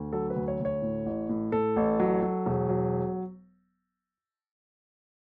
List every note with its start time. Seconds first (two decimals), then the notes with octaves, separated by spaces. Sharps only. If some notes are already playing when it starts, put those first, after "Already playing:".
Already playing: D2
0.13 F#3 A4
0.30 B4
0.36 D2
0.48 C#5
0.60 D2
0.65 C#5
0.82 A2
1.06 A1
1.29 A2
1.52 A2 A4
1.76 A1
2.00 F#3
2.22 F#3
2.46 E1
2.69 F#3